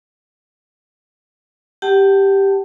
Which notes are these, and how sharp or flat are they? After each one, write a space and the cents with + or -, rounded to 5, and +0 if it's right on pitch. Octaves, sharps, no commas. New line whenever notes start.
G4 +0 F#5 +45 A5 +0